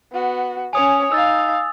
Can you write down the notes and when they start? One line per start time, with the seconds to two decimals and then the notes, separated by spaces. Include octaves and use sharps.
0.12 B3 F#4
0.73 C#4 C#5 G#5 D#6 F7
1.12 D#4 F5 E6 A6